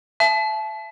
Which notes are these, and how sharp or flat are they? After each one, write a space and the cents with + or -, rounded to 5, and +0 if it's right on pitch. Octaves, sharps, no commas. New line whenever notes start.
E5 +30 A5 -30